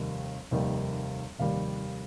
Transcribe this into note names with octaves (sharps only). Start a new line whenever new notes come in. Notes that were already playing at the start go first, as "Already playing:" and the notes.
Already playing: F1 D#2 D#3 G3
F1 D#2 D#3 G3
F1 D#2 D#3 G3 F5